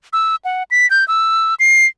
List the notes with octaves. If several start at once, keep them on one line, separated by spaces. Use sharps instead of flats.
E6
F#5
B6
G6
E6
C7